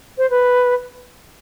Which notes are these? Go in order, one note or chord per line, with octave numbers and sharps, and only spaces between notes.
C5
B4